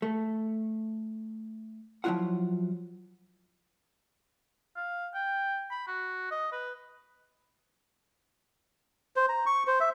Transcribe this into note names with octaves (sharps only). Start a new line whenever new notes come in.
A3
F3 F#3 C4 E4 F4 F#5
F5
G5
B5
F#4
D#5
B4
C5
A#5
C#6
C5
E5